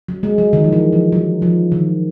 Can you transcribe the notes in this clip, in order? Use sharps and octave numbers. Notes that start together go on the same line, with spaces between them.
F#3
G#3
F#3
D#3
F3
E3
F3
F#3
F3
D#3